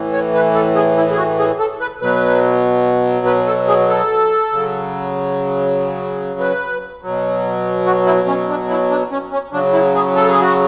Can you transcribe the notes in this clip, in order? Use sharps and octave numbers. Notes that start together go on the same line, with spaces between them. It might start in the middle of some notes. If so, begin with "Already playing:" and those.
Already playing: A2 E3
C#5
B4
A4
G#4
E4
G#4
F#4
G#4
A4
B4
B2 F#3 B4
B4
A4
G#4
A4
C#3 F#3
B4
B2 F#3
F#4
E4
C#4
D4
E4
D4
C#4
C#4
C#3 F#3 D4
E4
G#4
A4
G#4
F#4